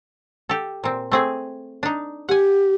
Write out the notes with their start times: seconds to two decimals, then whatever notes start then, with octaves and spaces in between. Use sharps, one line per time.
0.49 G4 A4
0.84 A#2 C4
1.12 A3 C4 G#4
1.83 D4 D#4
2.29 G4 F#5 G#5